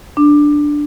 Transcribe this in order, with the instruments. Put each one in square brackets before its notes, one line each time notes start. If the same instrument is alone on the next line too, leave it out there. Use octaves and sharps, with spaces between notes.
[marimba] D4